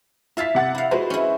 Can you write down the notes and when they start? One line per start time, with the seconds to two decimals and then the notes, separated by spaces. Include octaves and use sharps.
0.37 E4 E5 F5 A5 B6
0.55 C3 F#5 A6
0.75 E4 F5
0.91 G#3 F#4 B4 C5
1.10 C#4 E4